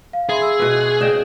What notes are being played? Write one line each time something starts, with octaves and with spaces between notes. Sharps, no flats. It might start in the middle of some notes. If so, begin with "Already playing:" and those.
F5
G#4 E5 B5 C6
E6
B2 F#4 B4
C#3 D5 D#5 G5 E7